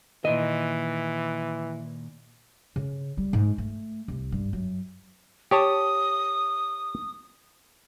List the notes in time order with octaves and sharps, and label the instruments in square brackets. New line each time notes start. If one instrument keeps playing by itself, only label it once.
[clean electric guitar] A#2 D#3 [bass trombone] E3 [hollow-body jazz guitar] D#5
[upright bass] C#3
G3
G#2
A3
C2
G2
F#2
[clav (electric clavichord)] G4 C#5 A5 [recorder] D#6